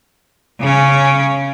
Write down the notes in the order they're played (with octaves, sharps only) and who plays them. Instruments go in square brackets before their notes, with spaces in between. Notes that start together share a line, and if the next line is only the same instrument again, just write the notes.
[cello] C#3 C#4